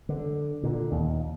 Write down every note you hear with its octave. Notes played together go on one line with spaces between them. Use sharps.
D3
A#2 D3
D#2